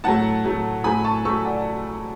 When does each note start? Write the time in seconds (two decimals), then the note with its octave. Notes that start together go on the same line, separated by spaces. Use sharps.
0.04 A2 F#3 A3 F#5 A5
0.44 A2 F#3 A3
0.84 A2 F#3 A3 G#5 B5
1.04 A5 C#6
1.25 A2 F#3 A3 C#6 E6
1.45 D5 F#5